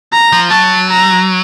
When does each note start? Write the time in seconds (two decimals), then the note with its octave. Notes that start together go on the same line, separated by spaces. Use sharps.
0.13 A#5
0.32 F3
0.51 F#3 A5
0.89 A#5